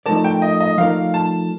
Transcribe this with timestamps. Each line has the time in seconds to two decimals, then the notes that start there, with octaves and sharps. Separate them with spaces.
0.06 F3 A3 D#4 A#4 D5 A5
0.24 G5
0.42 D#5
0.60 D#5
0.77 F3 A3 D#4 A#4 D5 F5
1.14 A5